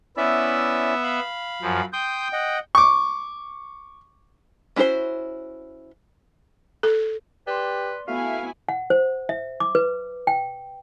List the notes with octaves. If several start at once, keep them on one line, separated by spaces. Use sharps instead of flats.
B3 C#4 E4 D5 E5
F5 B5
F#2 F3
G5 C6 D#6 G6
D#5 F#5
C#6 D6
C#4 E4 F#4 A#4 C5
A4
G4 B4 D5 C6
A3 B3 E4 F#4 F5 G#5
F#5
C5
E5
D6
B4
G5